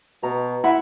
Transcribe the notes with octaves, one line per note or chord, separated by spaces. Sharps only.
B2 A#5
E4 E5 F#5 B5